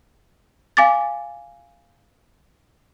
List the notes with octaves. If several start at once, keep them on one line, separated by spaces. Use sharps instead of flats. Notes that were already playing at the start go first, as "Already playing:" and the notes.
F5 G#5 D6 A6